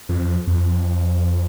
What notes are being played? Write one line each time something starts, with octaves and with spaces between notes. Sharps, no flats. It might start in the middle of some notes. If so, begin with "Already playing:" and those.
F2
F2